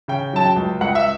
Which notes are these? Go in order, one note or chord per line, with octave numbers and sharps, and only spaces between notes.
C#3 G5
F#3 A5
G5
C#2
C#2 F#5
E5